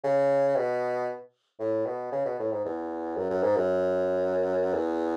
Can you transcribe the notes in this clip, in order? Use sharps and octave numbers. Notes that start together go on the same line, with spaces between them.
C#3
B2
A2
B2
C#3
B2
A2
G#2
E2
F#2
F#2
G#2
F#2
E2